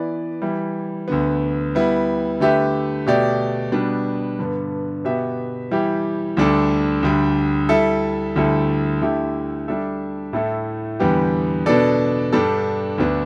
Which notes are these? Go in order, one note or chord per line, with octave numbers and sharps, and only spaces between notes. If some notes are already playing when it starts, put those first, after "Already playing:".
Already playing: E3 B3 E4 B4 D5
E3 G3 E4
D2 D3 B3
G3 B3 E4
D3 A3 G4 B4 E5
B2 A3 G4 D5
B2 G3 B3 D4 B4
G2 D3 B3
B2 B3 G4 E5
E3 G3 E4 G4
D2 D3 G3 D4 A4
D2 D3 G3
G3 E4 A4 E5
D2 D3 G3 E4 A4
D3 A3 E4 G4
G3 D4 A4 E5
A2 A3 E4 A4
E2 D3 G3 B3 G4
B2 B3 D4 A4 D5
G2 G3 D4 A4
D2 D3 B3 D4